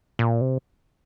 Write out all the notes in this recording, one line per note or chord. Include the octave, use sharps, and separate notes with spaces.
A#2
C3